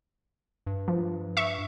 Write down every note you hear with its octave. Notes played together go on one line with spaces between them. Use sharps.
G2
F3
E5 C#6